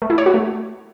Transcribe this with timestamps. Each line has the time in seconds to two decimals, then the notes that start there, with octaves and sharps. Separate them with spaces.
0.02 A3
0.10 E4
0.18 C#5
0.26 F#4
0.34 A3